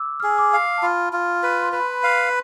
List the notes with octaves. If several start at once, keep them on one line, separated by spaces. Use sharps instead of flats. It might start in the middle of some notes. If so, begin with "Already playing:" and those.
Already playing: D6 E6
G#4 F6
E6
D6
F5
A5
F4 B5
F4
B4
C6
B4 B5
F5